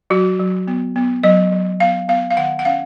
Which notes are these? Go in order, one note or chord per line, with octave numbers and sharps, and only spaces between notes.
F#3 F#4
F#3
B3
B3
F#3 D#5
F#3
B3 F5
B3 F5
F5
D#3 F#5
F#5
C#4 F5